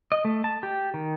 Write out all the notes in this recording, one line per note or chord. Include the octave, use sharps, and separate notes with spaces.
D#5
A3
A5
G4
D#3